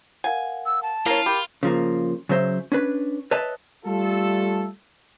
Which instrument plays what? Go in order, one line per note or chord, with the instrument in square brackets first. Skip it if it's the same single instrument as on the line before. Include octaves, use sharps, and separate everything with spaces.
[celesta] A#4 F5 F#5 [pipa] G#5
[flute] E6
A5
[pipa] A#3 C#4 [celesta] E4 [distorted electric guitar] F4
[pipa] G4 [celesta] A#4 B5
[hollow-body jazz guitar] C#3 F3 A#3
C#3 F#3 C5 E5
C#4 D4 B4
B4 C#5 D#5 E5 A5
[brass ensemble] G3 A3 F4 A4